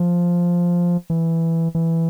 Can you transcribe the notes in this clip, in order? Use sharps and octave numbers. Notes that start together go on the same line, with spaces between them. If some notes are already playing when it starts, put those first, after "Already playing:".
Already playing: F3
E3
E3